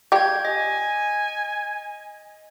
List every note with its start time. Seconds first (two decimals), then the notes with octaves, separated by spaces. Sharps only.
0.12 G3 F4 G4 G6 G#6
0.45 D#5 G#5